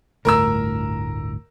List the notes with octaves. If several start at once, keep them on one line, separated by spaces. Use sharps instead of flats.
G1 D2 A2 A#4 A#5 E6